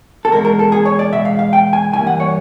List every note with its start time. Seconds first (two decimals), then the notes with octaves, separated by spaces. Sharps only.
0.25 A4
0.32 E2 B2 G#3 A#4
0.45 A#4
0.59 A4
0.72 G#4
0.85 C#5
0.99 D5
1.12 E2 B2 G#3 E5
1.25 F5
1.39 F5
1.53 G5
1.73 G#5
1.93 G2 E3 G3 A#3 G#5
2.07 F#5
2.20 C#5